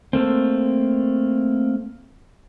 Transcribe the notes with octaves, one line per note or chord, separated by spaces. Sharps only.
A3 A#3 C4